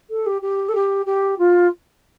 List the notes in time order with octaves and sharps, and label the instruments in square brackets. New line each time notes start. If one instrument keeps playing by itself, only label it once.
[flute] A4
G4
G4
A4
G4
G4
F4